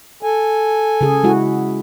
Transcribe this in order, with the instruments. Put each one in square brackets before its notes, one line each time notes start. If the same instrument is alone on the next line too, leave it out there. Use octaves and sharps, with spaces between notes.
[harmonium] A4 G#5
[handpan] C#3 G#4
G#3 E4 F#4